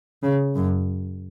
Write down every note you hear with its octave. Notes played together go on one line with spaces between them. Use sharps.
C#3
F#2